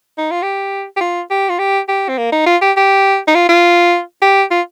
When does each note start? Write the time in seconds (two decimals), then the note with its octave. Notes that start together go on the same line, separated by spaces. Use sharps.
0.18 D#4
0.31 F4
0.43 G4
0.97 G4
1.01 F4
1.31 G4
1.49 F4
1.59 G4
1.89 G4
2.09 C4
2.18 A#3
2.32 D#4
2.46 F4
2.62 G4
2.77 G4
3.28 D#4
3.35 F4
3.49 F4
4.22 G4
4.51 F4